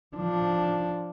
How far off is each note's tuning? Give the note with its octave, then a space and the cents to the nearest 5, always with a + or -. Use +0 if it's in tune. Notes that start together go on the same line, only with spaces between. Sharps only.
F3 +0 D4 +0